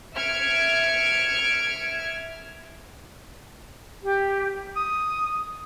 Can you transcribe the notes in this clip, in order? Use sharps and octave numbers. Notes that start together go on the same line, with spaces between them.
E5 F6 G#6 C#7 D7
G4
D#6